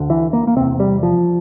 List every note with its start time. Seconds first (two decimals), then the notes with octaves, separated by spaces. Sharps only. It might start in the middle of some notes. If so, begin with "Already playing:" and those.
Already playing: D2 D3
0.10 E3
0.33 A#3
0.47 A#3
0.56 E2 C3 C4
0.80 G3
1.03 F3